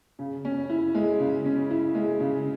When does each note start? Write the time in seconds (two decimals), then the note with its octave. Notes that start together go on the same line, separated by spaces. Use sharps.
0.19 C#3
0.45 C#4
0.70 E4
0.95 G#3
1.19 C#3
1.45 C#4
1.70 E4
1.95 G#3
2.20 C#3